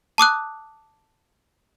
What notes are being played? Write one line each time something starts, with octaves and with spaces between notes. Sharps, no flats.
A5 D6 D#6 F#6